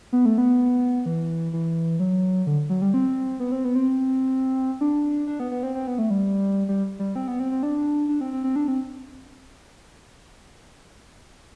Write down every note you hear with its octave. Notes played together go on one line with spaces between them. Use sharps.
B3
A3
B3
E3
E3
F#3
D3
F#3
G3
C4
B3
C4
B3
C4
D4
D4
B3
B3
C4
C4
B3
A3
G3
G3
G3
C4
B3
C4
C4
D4
D4
C4
C4
C4
D4
C4